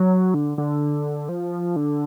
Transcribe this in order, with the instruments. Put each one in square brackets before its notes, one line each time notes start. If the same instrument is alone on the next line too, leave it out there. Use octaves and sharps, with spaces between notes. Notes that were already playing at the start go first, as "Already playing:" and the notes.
Already playing: [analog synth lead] F#3
D3
D3
F3
D3